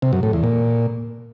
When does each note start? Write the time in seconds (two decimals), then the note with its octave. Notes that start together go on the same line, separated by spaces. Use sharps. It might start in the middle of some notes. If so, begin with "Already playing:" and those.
0.02 C3
0.13 F#2
0.23 A2
0.33 E2
0.44 A#2